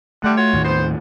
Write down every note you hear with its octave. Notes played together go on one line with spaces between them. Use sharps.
D3 G3 A3 F#5
F4 F#4 C#5
D#2 A2 D#3
B3 C5